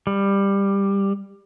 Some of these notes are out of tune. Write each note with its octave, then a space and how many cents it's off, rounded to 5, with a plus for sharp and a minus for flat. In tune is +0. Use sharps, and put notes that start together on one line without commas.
G3 +15